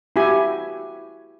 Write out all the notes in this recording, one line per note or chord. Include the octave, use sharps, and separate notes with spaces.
E4 F#4 G4 G#5